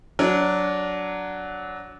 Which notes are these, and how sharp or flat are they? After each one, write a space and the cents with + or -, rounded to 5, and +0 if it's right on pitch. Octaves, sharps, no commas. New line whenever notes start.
F#3 +0 D4 -15